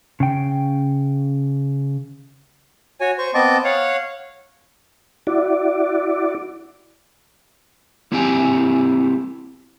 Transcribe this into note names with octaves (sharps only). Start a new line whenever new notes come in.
C#3 G5
F#4 C#5 G#5
C5 C#6
B3 C4 D#5 A5 D6
C#5 F5 F#5
E4 F#4 D5
A#3 C4 E4 G4 G5 G#5